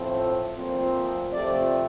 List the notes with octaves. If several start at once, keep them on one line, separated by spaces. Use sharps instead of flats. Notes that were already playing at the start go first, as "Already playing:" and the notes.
Already playing: A2 F3 A3 C4
A#2 F3 A3 C4
C3 F3 A3 C4 D5